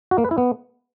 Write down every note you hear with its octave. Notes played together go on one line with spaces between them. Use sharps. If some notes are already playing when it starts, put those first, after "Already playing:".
F#4
A#3
B4
E4
B3